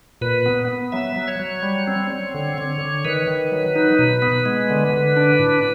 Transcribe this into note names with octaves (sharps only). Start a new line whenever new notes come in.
A#2 B4
B3
B3
F#3 E5
F#3
C#5
F#3
G3
C4
C4
D3
D3
D3
D#3 B4
D#3
F#3
D#4
B2
B3
G#3
D3
D3
D4
A2